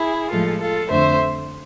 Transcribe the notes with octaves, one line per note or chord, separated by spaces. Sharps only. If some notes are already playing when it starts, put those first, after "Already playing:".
Already playing: E4 G#4
A2 F3 G#3 F4 A4
F4 A4
F2 D3 A3 C5 E5